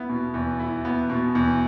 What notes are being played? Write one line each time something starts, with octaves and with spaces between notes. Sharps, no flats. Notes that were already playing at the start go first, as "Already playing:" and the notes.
Already playing: B3 E4
B2
E2
E4
B3
B2
E2